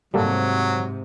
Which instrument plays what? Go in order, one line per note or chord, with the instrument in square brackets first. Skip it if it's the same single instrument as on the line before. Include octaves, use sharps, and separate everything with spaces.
[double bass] G#2 C3 [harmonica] F#3 [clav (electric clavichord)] G3 A#3 A4